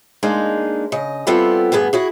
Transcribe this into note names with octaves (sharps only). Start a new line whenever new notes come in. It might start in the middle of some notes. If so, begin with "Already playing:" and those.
G#3 A#3 D4 D#4
C#3 D#5
G3 B3 C4 E4 F4 A4
D2 G2 B3 G#4
E4 F#4 G#4